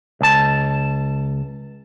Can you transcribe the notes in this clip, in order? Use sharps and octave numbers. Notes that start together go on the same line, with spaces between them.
C#2 A5